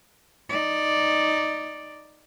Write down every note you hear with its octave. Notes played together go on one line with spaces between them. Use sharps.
D#4 D5